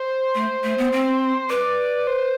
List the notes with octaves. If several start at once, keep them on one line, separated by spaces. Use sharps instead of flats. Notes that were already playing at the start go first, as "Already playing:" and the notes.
Already playing: C5
A3
A3
B3
C4
B4 D5
C5